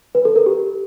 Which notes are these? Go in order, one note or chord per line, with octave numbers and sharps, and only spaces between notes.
B4
A4
A#4
G4